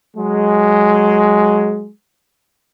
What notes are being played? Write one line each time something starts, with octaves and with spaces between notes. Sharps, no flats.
F#3 G#3